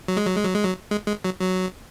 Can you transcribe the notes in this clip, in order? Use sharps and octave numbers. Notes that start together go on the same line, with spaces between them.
F#3
G#3
F#3
G#3
F#3
G#3
F#3
G#3
G#3
F#3
F#3